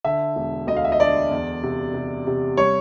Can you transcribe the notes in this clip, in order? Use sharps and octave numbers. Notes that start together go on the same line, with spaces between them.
D3 E5
E1
D2 D#5
F5
E5
D#5
D3 D5
E2
C3
C3
C3
G3 C#5